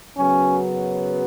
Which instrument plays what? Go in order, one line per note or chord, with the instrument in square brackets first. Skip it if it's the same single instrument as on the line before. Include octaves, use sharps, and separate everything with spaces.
[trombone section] F#2 C#3 F#3 B3 C#4